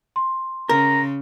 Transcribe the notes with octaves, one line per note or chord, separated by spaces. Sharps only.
C6
C#3 A#4 A#5